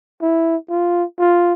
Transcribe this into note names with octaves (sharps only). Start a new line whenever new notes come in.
E4
F4
F4